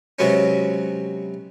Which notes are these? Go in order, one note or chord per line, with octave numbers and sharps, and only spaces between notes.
C3 F#3 G#3 B3 C#4